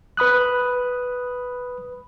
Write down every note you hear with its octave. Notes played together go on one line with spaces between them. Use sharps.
B4 B5 D#6 F#6